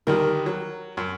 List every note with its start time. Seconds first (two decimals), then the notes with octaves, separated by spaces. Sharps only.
0.07 D2 D#3 G3 A#4
0.46 F#3
0.97 F#2